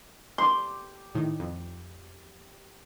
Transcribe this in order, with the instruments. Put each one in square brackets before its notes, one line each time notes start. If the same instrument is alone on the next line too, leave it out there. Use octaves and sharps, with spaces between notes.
[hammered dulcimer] G4 D6 [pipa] C6
[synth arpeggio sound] A2 D#3
F2